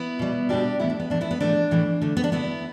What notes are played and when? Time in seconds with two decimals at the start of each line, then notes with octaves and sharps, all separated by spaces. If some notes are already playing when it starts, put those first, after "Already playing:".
Already playing: B3 E4
0.19 B2 G3
0.49 B2 G3 D4 G4
0.80 A2 E3 A3 B3 E4
0.90 D4
1.00 B3
1.10 A2 E3 A3 D4
1.21 B3 E4
1.31 B3
1.41 A2 E3 A3 D4
1.71 A2 E3 A3
2.02 D3 A3
2.17 B3
2.24 D4
2.32 D3 A3 B3 E4